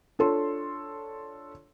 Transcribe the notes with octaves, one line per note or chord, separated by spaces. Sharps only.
D4 F4 A4 C#5 C6